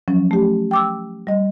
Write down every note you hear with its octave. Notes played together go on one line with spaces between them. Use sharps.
F3 F#3 C#4
A3 G4
G5 D6 E6
G3 D#5